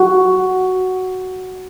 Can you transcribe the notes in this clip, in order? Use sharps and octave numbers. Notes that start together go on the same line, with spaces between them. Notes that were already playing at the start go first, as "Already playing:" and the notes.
Already playing: F#4